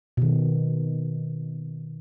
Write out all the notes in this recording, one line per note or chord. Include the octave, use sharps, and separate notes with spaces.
B2 D#3